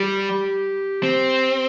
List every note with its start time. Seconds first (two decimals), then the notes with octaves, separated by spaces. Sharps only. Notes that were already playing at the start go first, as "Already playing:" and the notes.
Already playing: G3 G4
1.03 C4